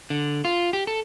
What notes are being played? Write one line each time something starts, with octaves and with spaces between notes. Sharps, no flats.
D3
F4
G4
A4